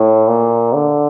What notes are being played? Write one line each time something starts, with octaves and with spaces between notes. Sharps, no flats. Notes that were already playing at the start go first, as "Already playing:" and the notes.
Already playing: A2
A#2
D3